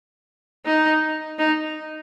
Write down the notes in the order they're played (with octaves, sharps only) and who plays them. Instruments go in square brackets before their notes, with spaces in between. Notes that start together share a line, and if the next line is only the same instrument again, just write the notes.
[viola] D#4
D#4